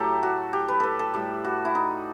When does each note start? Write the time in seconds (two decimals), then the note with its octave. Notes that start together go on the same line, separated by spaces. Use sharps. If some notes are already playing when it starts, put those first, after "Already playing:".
Already playing: A2 F#3 A3 G4 A4
0.23 F#4
0.53 G4
0.68 B4
0.80 A4 B4
0.99 A4
1.14 A2 G3
1.44 F#4
1.65 E4
1.75 D#4